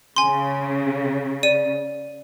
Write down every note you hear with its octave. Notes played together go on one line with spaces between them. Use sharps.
C#3 G#5 C6
D5 D#7